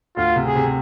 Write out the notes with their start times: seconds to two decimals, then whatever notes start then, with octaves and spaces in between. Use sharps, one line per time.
0.16 D2 F4
0.36 C3
0.46 G#4
0.55 C3